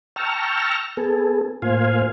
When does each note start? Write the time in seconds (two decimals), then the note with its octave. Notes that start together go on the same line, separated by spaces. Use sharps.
0.16 G5 A5 A#5 C#6 E6 F6
0.97 B3 G#4 A4
1.62 A2 A#3 F4 C5 F5 G#5